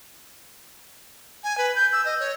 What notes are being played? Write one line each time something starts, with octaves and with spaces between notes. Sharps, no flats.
G#5
B4
G6
E6
D#5
C#5